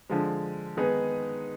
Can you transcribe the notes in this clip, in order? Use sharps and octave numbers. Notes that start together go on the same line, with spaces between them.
D3 F3 G#3
D#3 G#3 B3 D#4 G#4